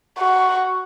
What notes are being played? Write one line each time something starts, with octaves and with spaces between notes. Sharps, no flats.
F#4